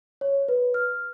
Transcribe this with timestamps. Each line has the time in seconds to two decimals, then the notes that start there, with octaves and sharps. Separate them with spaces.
0.21 C#5
0.48 B4
0.74 F6